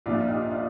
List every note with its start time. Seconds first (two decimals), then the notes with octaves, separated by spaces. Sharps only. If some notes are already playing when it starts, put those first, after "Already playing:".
0.06 A#1 A#2 F3 D4 F4
0.28 D#4 G4
0.50 D4 F4